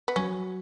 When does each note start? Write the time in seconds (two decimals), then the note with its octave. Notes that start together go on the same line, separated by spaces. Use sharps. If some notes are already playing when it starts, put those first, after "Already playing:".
0.08 B3
0.16 F#3 C#4